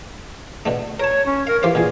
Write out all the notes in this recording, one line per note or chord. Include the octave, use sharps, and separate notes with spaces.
B2 D3 A3
A#4 C#5 A5
C#4
A#4 F5
E3 G4 C5 F5
A#2 D3 E3 G#4